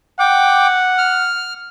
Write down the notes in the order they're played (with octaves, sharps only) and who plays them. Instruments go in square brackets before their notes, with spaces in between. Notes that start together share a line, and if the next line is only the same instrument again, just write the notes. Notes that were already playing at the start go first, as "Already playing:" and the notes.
[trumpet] F#5 [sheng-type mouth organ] G5 D6
[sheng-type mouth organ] F6